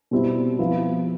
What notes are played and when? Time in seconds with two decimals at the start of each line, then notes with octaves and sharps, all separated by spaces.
0.11 B2 G3 C4 E4
0.59 F3 B3 E4